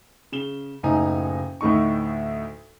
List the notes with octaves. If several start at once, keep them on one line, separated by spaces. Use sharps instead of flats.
C#3 E7 G7
F#1 A2 D#4 G#5 A#5
D2 A2 A3 D#4 C#6